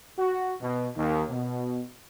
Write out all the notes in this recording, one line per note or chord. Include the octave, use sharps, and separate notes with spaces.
F#4
B2
D#2
B2